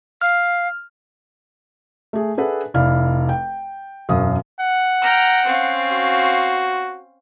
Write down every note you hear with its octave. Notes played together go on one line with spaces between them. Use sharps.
F5 F6
A3 G#4
D4 G#4 A4 B4 E5 F#5
F1 E4 D5 F5 F6
G5
E1 F#2 F5 D#6
F#5
G5 A#5 F6
C4 C#4 F5
F#4